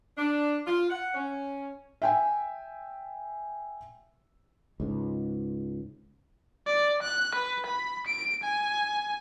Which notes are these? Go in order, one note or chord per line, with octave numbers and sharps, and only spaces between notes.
D4
F4
F#5
C#4
E5 G5 G#5
C#2 G#2
D5
F#6
B4
B5
D7
G#5